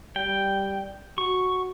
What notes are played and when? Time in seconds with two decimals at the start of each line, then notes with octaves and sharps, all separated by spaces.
0.16 G3 G5
1.18 F#4 C#6